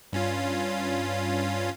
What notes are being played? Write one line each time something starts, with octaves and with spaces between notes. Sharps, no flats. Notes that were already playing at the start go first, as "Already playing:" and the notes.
G2 C#4 F4